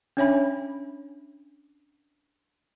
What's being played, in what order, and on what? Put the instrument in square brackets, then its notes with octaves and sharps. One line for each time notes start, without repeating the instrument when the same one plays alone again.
[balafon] C#4 D4 C#5 E5 G#5 B5